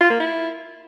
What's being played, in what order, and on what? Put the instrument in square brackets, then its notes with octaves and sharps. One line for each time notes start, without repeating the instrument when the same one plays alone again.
[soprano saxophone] F4
A#3
E4